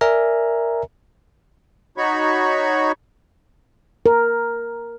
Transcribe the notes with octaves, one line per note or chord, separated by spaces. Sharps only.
A#4 D5 E5 G#5 A#5
D#4 F#4 C#5 B5 C#6
A#4